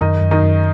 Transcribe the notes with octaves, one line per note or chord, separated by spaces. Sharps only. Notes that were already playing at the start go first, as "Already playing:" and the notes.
F#2 D#3 D#4
F#2
D#3 D#4
F#2